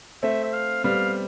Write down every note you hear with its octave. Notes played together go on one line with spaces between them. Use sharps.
A3 C4 E5
E5
F5
G3 B3 F5